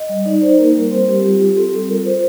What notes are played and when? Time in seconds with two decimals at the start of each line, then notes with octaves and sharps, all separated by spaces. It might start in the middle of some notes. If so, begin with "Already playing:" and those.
Already playing: D#5
0.09 G3
0.26 D#4 D5
0.42 D#4 C5
0.58 A#3 A#4
0.75 G3
0.91 C4 C5
1.08 G3 G4
1.24 F4 G4
1.40 F4
1.57 C4 A4
1.73 G3
1.89 F4 A#4
2.05 F4 C5